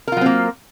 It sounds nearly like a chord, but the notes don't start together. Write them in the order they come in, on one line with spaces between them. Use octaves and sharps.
A#4 F4 F#3 C4 A#3